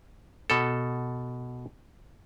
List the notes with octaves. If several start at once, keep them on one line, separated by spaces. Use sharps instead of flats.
B2 A4